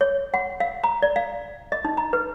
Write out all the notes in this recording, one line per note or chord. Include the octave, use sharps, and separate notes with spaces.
C#5
F#5
F5
A#5
D5
F5
D#5
D#4
A#5
B4